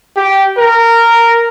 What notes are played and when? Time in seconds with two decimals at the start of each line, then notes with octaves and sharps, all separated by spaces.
0.17 G4
0.58 A#4